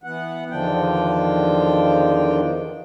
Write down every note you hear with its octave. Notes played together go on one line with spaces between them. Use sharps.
E3 B3 F#5
E2 D3 D#3 F3 D4 G5